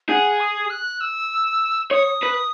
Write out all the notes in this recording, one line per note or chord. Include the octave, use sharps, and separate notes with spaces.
G#4 F#5
D#6
F#6
E6
C#5 D#6
B4